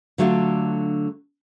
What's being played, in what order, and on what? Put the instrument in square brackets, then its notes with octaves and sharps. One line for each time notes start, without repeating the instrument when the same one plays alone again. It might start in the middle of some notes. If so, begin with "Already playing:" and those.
[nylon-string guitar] D3 F#3 A3 D4 F4